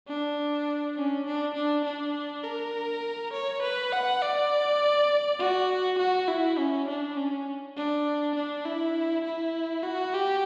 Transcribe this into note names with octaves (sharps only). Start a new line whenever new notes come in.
D4
C#4
D4
D4
D4
A#4
C#5
B4
F#5
D5
F#4
F#4
E4
C#4
D4
C#4
D4
D4
E4
E4
F#4
G4